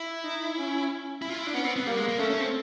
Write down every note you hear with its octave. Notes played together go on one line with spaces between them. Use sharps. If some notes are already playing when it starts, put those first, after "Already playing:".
Already playing: E4
D#4
C#4
E4
F4
E4
D4
B3 C#4
C4
B3
G3 A#3
G#3
A#3
A3 C#4
C#4
C4